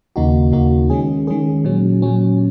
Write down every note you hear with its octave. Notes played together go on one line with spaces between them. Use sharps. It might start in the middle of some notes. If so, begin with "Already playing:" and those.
D#2 C#3 A#3 D#4 F#4
D#2 C#3 A#3 D#4 F#4
D#3 G#3 C#4 G#4
D#3 G#3 C#4 G#4
A#2 F#3 C#4
A#2 F#3 C#4